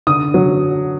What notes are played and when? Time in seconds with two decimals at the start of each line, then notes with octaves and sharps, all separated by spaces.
0.07 D3 D#6
0.34 F#3